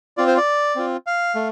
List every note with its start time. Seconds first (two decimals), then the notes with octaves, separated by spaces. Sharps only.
0.17 C4 F4 D5
0.27 C5
0.37 D5
0.76 C4 F4
1.07 F5
1.35 A3